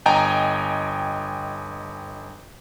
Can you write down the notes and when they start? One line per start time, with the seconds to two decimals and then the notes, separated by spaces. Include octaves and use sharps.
0.06 G1 D#5 G5 G#5 A#5